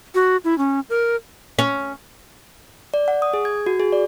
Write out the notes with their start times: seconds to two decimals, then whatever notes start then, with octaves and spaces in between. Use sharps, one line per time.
0.15 F#4
0.44 E4
0.58 C#4
0.90 A#4
1.59 C#4
2.94 D5
3.08 F#5
3.22 D#6
3.34 G#4
3.45 G#6
3.66 F#4
3.80 G#4
3.93 D5